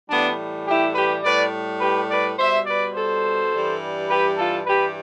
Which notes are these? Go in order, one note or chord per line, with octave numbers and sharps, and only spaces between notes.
A2 E3 G3 B3 D4
E4 G4
G4 B4
A2 G3 B4 D5
G4 B4
B4 D5
B2 G3 C5 E5
B4 D5
A4 C5
G2 E3 G3
G4 B4
F4 A4
G2 E3 G3 G4 B4